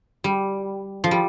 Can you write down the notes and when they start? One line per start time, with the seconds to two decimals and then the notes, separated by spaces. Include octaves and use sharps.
0.24 G3
1.04 F3
1.11 G3